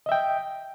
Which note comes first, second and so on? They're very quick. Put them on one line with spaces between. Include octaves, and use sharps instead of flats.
D#5 E5 G5